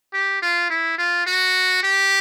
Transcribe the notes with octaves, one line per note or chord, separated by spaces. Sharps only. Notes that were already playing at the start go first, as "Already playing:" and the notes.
G4
F4
E4
F4
F#4
G4